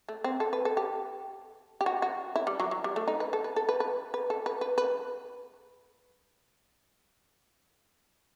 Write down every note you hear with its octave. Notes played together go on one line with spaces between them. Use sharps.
A3
C4
A4
B4
A4
G4
G4
F#4
F#4
E4
G3
F#3
F#3
G3
A3
D#4
B4
A4
B4
A4
B4
B4
B4
A4
B4
B4
B4